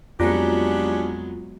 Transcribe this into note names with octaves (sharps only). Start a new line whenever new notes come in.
F2 F#3 G#3 B3 C#4 D4 F4 G4